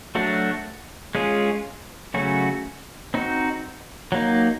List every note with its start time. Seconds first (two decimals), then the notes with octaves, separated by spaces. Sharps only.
0.15 F#3 A3 D4 F#4
1.15 G#3 C#4 F4 G#4
2.14 C#3 F#3 A3 C#4 F#4
3.14 C4 D#4 F#4
4.12 F#3 A#3 D#4